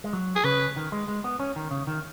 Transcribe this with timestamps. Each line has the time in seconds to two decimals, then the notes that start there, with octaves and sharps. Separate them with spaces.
0.04 G#3
0.13 F#3
0.36 G#4
0.44 C#3 B4
0.76 D#3
0.92 G#3
1.08 G#3
1.24 B3
1.40 C#4
1.56 D#3
1.71 C#3
1.87 D#3